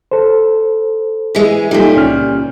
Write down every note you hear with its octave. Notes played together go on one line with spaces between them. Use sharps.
A4 C5
E3 G#3
A#2 G3 D#4 F4 A4
C#2 C#4 F6